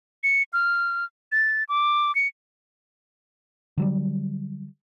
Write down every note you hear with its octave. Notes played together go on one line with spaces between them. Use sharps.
C#7
F6
A6
D6
C#7
D3 F#3 G3